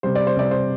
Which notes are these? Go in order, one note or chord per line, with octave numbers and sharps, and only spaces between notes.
C3 G3 C5
D5
C5
C3 G3 D5
C5